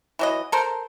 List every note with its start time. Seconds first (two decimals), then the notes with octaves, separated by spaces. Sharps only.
0.19 E3 F#3 D#5
0.52 A4 A#4 C5